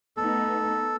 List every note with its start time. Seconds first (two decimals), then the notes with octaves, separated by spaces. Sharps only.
0.17 A3 B3 D#4 A4